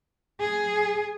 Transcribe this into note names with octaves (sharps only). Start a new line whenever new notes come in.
G#4